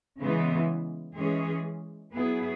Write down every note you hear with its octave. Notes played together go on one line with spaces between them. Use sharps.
C#3 E3 G#3 B3 E4
E3 G#3 C#4 G#4
F#3 B3 E4 G#4